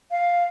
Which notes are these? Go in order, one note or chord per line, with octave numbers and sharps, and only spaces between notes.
F5